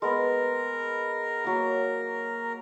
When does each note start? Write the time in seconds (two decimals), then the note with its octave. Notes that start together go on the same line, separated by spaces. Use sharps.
0.02 G#3 B3 A#4
1.44 F#3 A#3